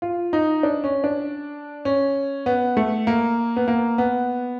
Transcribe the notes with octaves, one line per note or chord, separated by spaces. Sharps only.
F4
D#4
D4
C#4
D4
C#4
B3
A3
A#3
B3
A#3
B3